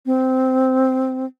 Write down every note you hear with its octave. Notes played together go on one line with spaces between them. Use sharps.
C4